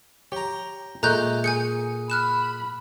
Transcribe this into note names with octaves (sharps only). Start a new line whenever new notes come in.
G4 C#5 G5 A#5
A#2 G#3 A3 A#5 F#6 G6
G#4 G#5 G6 C#7
B5 F6 F#6 E7